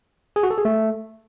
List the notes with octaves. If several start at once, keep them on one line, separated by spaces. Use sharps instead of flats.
G#4
F#4
A4
G#4
A3